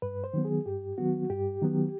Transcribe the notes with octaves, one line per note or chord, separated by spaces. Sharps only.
G2 B4
C5
D#3 F#3 B3
G#4
G2 G4
D#3 F#3 B3 F#4
G2 G4
D#3 F#3 B3